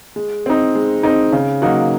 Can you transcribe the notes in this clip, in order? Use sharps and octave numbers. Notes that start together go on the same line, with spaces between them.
G#3
C4 D#4
G#3
C4 D#4
C#3
F#3 A#3 D#4 F#4